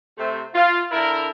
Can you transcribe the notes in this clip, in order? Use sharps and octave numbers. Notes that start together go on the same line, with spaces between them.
C3 A3 C5
F4
D3 E4 A#4